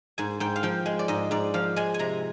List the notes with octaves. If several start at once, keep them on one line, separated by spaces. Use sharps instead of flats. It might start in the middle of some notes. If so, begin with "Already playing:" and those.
G#2 G#5
G#2 G5
F5
F3 G5
G#3
D5
G#2 D#5
G#2 D5
F3 F5
G#3 G#5
G#5
C3 A#5